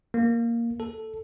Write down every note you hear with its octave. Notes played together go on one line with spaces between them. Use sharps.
A#3
A4